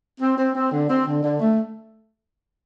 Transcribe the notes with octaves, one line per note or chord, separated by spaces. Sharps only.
C4
C4
C4
D3
C4
D3
D3
A3